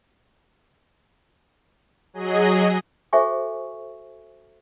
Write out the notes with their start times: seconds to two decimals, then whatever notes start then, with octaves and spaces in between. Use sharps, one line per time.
2.13 F#3 G#4 D#5
3.13 F#4 A4 C5 E5 G#5 C#6